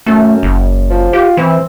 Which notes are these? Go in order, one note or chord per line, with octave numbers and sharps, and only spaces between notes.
F#2 A3
F#1
F3
F4 G4
E3 C4